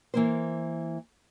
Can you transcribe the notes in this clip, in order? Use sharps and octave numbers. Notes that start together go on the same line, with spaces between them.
E3 A#3 C5